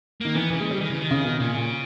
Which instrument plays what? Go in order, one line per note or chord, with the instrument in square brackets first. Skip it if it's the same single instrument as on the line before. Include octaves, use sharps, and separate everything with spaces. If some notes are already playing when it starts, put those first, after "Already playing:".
[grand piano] D#3 [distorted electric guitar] A#3
[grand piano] E3 [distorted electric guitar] B3
[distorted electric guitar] C#3 [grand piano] E3
[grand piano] G#3
G3
[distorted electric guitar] D#3 [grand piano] E3
[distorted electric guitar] C#3
D#3
[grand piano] C#3
B2
[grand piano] A#2 [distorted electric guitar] C#3
[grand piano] A#2